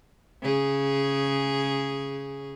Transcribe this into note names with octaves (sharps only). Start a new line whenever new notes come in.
C#3 G#4